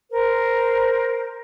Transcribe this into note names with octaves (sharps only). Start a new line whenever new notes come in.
A#4 C5